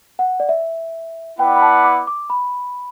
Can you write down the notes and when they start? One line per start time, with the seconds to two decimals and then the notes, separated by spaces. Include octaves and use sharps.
0.19 F#5
0.40 D5
0.49 E5
1.39 B3 E4 B4 D5 F#5 G5
1.56 B5
1.62 A5
1.84 D6
2.07 D6
2.30 B5